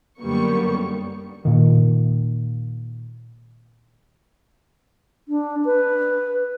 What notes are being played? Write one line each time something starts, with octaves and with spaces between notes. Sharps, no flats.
F#2 D3 G3 A#3 B3 C#6
A#2 D#3
D4
B4